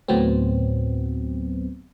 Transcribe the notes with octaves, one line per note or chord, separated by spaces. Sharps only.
D2 A2 F#3 B3 C4